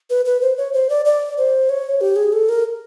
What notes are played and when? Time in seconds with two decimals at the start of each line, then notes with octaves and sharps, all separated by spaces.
0.10 B4
0.25 B4
0.41 C5
0.57 C#5
0.73 C5
0.90 D5
1.05 D5
1.37 C5
1.69 C#5
2.01 G4
2.16 G#4
2.33 A4
2.49 A#4